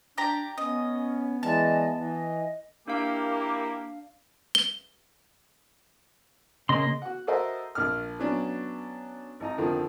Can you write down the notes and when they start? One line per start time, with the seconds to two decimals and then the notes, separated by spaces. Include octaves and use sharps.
0.18 D4 G4 D5 A#5
0.58 B3 C#4 D#5
1.43 E3 G#3 D5 D#5 A5
1.98 E3 D#5
2.88 A#3 D4 E4 G4 F5
4.55 G7
6.69 C#3 A#3 D#5 C6
7.02 F#4 F#5
7.27 F#4 A4 A#4 C5 D#5 E5
7.75 A#1 F6
8.20 F#3 B3 C#4 D4
9.40 G#1 D#4 A#5
9.58 F2 D3 D#3 F3